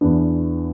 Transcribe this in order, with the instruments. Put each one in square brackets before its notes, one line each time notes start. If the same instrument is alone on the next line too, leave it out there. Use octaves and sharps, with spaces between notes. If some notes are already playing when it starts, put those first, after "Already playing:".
[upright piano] E2 E3 B3 D4